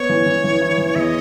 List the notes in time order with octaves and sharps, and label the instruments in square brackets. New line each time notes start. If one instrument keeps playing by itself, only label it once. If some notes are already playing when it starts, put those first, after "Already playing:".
Already playing: [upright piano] B3 [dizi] C#5
[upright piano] E3
E3
E3
E4
E3
[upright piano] E2 [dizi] D#5 E5